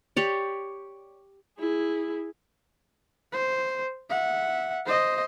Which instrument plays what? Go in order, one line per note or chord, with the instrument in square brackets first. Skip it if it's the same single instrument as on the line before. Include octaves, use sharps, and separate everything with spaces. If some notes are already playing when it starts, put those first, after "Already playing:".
[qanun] G4 C#5 D5
[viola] E4 G#4
[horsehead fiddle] C5
E5 F#5
C5 D#5